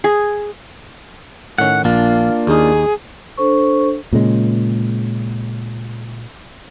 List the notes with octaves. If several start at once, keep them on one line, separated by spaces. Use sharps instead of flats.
G#4
A2 D#3 C#4 F#5
A#1 A#3 D4 F4
D#2 D#4 G#4
D4 A4 C5 C#6
A#2 C#3 G#3